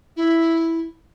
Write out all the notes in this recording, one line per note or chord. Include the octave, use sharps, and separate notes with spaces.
E4